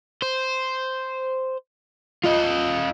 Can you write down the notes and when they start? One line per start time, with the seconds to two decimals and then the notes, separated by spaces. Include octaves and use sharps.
0.22 C5
2.25 F4 D#5